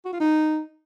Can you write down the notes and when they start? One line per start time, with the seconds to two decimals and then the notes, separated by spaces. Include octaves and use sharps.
0.05 F#4
0.13 F4
0.20 D#4